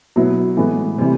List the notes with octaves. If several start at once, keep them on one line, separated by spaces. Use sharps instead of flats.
B2 F#3 B3 E4
A2 E3 G#3 B3
C3 E3 G3